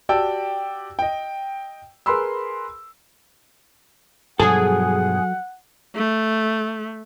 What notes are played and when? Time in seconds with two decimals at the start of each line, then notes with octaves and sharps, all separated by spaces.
0.09 F#4 G4 D5 G5 A5 E6
0.99 D#5 G5
2.06 G#4 A#4 B4 B5 C6 E6
4.39 G2 B2 F3 F#3 G#4 A4 F#5
5.96 A3